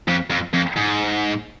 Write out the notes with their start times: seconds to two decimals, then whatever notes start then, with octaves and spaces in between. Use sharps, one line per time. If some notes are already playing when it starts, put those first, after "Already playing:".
0.08 F2
0.30 F2
0.54 F2
0.77 G#2